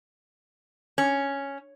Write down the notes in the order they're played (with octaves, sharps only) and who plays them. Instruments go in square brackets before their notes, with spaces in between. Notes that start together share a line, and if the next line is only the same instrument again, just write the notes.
[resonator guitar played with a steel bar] C#4